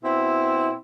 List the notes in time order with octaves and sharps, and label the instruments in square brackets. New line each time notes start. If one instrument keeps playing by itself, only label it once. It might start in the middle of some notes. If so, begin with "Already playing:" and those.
[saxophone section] B2 C4 E4